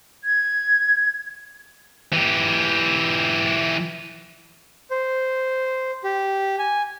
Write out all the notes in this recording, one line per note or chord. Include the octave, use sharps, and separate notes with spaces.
G#6
E3 G4
C5
G4
G#5